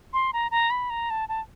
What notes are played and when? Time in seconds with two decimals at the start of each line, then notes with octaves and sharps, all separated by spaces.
0.13 C6
0.33 A#5
0.51 A#5
0.71 B5
0.90 A#5
1.10 A5
1.29 A5